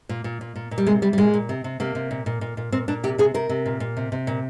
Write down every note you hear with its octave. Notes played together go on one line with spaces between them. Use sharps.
A#2
A#2
A#2
A#2
A#2
G3
C3 G#3
C3 G3
G3
A#2 G#3
A#2
C3
C3
C3 A#3
C3
A#2
A#2
A#2
A#2
A#2 C4
A#2 D4
C3 G4
C3 G#4
C3 A#4
C3
A#2
A#2
C3
C3
A#2